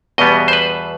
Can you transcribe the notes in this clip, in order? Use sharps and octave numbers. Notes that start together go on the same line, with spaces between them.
E2 B2 G3 B3 D#5
C5
B4